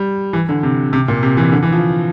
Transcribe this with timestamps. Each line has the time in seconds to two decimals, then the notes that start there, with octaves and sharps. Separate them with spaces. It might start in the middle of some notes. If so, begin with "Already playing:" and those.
Already playing: G3
0.33 E3
0.49 D3
0.63 C3
0.93 C3
1.08 A#2
1.23 C3
1.37 E3
1.52 D3
1.63 E3
1.72 F3